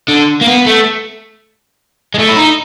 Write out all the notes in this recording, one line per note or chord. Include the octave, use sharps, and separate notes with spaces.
D3
A#3
B3
A3
G#3
A3
E4
D#4